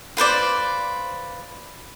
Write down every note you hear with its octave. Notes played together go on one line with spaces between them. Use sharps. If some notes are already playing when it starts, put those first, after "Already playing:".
F4 B4 C5 D5